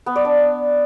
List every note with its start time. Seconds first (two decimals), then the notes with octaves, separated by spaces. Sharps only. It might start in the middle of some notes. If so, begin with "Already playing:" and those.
0.06 B3
0.16 D5
0.25 D4